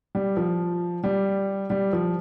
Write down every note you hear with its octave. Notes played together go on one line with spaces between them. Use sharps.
G3
F3
G3
G3
F3